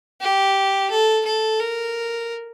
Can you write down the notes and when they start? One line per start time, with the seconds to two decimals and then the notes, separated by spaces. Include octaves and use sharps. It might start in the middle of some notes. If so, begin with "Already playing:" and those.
0.21 G4
0.91 A4
1.25 A4
1.60 A#4